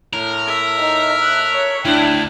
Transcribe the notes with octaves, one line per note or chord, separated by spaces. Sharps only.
A2 A#4
E5
D#4
F#6
C#5
D2 D4 E4 G5